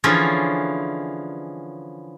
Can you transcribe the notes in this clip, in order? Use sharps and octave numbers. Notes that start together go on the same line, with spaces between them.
D3 E3 F3 C#4 F4 G#4